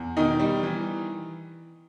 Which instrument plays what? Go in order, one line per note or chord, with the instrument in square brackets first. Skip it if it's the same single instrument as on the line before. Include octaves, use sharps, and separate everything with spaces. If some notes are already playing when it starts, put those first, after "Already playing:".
Already playing: [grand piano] E2
B2 D#3 D#4
G3
E3